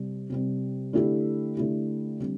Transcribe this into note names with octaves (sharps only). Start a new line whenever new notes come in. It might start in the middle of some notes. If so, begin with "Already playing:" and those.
Already playing: C3 G3 C4
C3 G3 C4
D3 A3 E4 G4
D3 A3 E4 G4
D3 G3 C4 G4